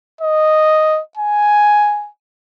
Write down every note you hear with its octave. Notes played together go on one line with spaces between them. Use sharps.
D#5
G#5